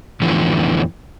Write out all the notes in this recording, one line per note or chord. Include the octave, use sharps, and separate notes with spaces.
F2 A2 D3 E3 F3 B3